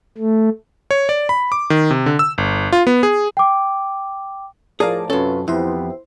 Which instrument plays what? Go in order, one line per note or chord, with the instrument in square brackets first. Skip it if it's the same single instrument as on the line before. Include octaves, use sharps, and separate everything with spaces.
[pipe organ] A3
[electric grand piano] C#5
D5
B5
D6
D#3
C3
D3
E6
G1
F4
B3
G#4
[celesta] G5 D6
[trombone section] A2 F3 [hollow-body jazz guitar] G#4 F5 [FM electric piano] A#4 D5 A5
[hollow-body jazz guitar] F#2 A4 [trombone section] C3 F4 B4 [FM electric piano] C#4
[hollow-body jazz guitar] F2 [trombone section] E3 B3 G4 [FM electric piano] E4 C5